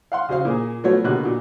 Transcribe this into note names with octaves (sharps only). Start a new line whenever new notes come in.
F5 F#5 C6
C#3 F#4 C5 F5
A#2 A#3 G#4
F3 F#3 A3 B3 F#4 C#5
B2 D3 A#3 F#4 G4 F#6
A#2 F#4